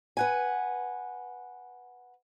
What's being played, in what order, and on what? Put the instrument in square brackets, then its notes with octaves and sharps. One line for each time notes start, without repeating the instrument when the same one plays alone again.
[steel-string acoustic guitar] B4 F#5 G#5